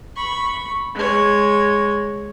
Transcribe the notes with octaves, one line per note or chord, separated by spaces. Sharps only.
B5 C#6
G#3 C#5